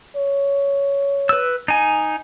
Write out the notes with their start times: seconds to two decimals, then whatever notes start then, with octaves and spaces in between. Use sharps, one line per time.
0.17 C#5
1.29 B4 E6
1.68 D#4 G#5